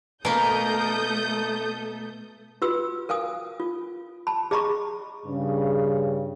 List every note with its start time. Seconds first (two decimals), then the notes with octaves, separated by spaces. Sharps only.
0.25 B2 A3 A#3 A4 A#4 D#6 G6
2.62 F4 F#4 B4 E6
3.09 A#4 F5 G#5 D#6
3.60 F4
4.27 A5 B5
4.51 G#4 D#5 A#5 B5 C#6
5.26 G2 C#3